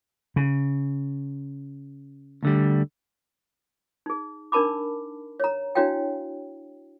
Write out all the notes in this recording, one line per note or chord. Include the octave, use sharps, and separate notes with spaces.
C#3
D2 D3 G3
D#4 G#4
D4 D#4 A#4 A5 B5 D6
C#5 A#5
D4 E4 F#4 C#5 F5 G5